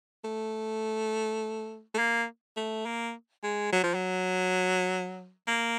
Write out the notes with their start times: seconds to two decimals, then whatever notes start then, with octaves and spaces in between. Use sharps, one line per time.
0.24 A3
1.94 A3
1.99 A#3
2.57 A3
2.86 A#3
3.43 G#3
3.73 F#3
3.83 F3
3.94 F#3
5.48 A#3